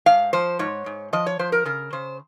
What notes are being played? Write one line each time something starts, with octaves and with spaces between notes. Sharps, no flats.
G#2 F5
F3 C5
G#2 C#5
G#2
F3 D#5
C#5
F3 C5
A#4
C#3 A#4
C#3 C5